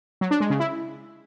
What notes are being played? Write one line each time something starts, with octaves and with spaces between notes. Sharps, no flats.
F#3
D4
G#3
C#3
E4